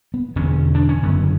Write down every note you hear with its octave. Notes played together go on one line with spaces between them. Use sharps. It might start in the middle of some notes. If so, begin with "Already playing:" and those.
B3
E1 E2 D3 C#4
D4
C#4
F#1 F#2 D3 B3